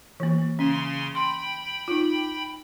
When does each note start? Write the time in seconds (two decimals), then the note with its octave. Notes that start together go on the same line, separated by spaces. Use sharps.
0.20 E3 A#3
0.59 C#3 C#4 G#5 C6
1.15 G5 B5 C6
1.88 D#4 F4